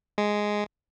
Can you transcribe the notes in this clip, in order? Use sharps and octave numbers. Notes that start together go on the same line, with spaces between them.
G#3